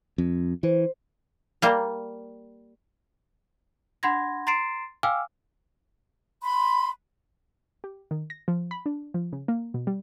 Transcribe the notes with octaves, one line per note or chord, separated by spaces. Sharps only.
F2
E3 C5
G3 A#3
D4 F#5 B5 C6 G#6 A#6
A#5 C6 A6 C7 D7 E7
F5 G5 G#5 D6 E6 F6
B5 C6
G4
D#3
A#6
F3
B5
D4
F3
C#3
A#3
B2
G3